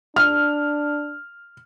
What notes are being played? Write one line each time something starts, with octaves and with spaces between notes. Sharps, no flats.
D4 F6